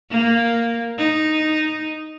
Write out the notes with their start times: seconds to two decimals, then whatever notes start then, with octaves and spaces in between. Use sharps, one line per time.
0.11 A#3
0.99 D#4